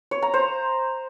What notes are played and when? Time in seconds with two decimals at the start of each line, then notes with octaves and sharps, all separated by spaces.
0.11 C#5
0.22 A#5
0.34 C5